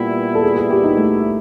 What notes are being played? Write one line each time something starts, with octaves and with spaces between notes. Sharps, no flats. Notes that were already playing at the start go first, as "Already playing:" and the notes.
Already playing: A#2 G3 B3 E4
A4
G#4
G#4
G4
D#4
A3